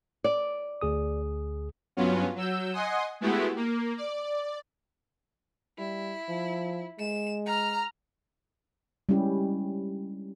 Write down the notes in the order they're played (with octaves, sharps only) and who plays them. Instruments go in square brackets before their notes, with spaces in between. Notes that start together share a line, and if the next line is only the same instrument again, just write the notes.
[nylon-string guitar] D5
[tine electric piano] D2 G#4 D#6
[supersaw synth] G2 F#3 B3 C#4 F4
F#3 E6 G6
D#5 F#5 G#5 C6 D#6
G#3 A3 B3 E4 F#4 G4
A#3
D5
[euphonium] G3 [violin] E4
[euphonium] F3
[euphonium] G#3 [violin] E7
[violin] A#5 F6
[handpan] G3 G#3 C#4 E4 G4